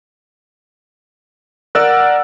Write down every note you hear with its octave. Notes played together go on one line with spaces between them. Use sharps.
A#4 D5 F#5 E6